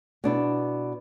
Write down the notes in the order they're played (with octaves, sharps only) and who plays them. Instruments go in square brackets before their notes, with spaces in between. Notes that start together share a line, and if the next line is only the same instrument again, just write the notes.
[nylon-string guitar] B2 D4 E4